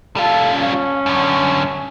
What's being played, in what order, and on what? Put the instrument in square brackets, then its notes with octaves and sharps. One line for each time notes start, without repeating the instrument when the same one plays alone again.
[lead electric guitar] G3 F4 [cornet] A4
[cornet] C#4
[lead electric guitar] F#2 D3